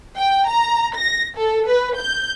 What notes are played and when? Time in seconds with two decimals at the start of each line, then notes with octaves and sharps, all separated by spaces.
0.15 G5
0.49 A#5
0.98 A#6
1.38 A4
1.67 B4
1.99 G6